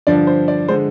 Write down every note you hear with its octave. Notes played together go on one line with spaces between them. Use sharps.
G2 D3 F3 D5
C5
D5
D3 G#3 C5